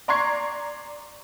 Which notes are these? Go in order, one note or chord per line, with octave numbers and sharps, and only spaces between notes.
D5 A#5 C6 C#6 G#6 C7